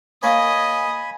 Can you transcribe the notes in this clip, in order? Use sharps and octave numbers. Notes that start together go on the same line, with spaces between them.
A#3 C#5 D#5 G#5 B5